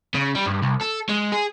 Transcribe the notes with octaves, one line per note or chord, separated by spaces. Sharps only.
C#3
G3
G2
C2
A4
G#3
G#4